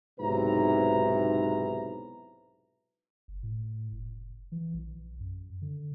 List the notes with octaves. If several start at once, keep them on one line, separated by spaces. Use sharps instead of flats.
B1 G#2 C3 E4 B4 A#5
F#1
A2
F1
E3
A#1
F#2
D3